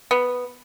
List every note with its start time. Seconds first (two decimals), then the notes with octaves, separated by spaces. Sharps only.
0.11 B3